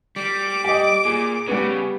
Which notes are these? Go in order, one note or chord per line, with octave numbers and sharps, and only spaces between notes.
G3 D6
G4 D#5
A#2 G#4
C#3 G3 B3